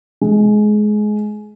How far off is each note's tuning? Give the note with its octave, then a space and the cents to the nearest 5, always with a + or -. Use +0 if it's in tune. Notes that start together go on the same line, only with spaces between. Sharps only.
G#3 +20